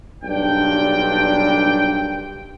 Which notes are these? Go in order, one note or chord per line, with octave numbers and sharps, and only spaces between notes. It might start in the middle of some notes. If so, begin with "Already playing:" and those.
B1 G2 A#2 D4 G5